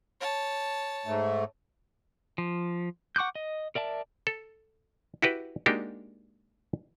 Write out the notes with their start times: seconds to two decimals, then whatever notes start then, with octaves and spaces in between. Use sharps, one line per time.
0.20 C#5 A5
1.06 G#2 A3
2.38 F3
3.16 F#5 C#6 D6 F#6 G6
3.35 D#5
3.75 A#4 D5 E5 A5
4.27 A4
5.22 E4 F#4 G4 B4
5.66 G#3 A#3 D4 D#4 F#4 G4